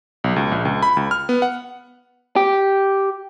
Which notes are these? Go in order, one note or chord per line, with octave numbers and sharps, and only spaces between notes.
B1
C#2
A#1
C#2
B5
C#2
F6
B3
F#5
G4